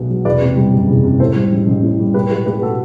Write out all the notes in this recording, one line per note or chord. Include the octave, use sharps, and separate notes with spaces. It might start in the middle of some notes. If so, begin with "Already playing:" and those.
Already playing: B1 B2 B3
F#3
E2 B4 D5
C3
G3
F#1
E2
C3
A2 A4 C5
G3
A1
A1
A2
G3
A2 G4 B4
F#3 G4 B4
A3 G4 B4
F#4 A4